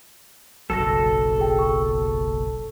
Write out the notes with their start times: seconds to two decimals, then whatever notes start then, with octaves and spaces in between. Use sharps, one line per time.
0.70 F#1 B1 F#3 A4 E6 A#6
1.38 G#4 G5
1.59 C#6